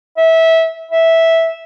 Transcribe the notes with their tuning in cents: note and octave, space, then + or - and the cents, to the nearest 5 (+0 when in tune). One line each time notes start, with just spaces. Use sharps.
E5 -20
E5 -10